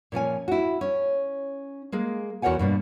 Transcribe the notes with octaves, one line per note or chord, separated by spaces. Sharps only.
A#2 F3 C#4 G#5
E4 F#4
C#4
G#3 A#3 G#4
E2 F#4 A#4 C#5 F#5 G#5
G2 B2 A#3 D4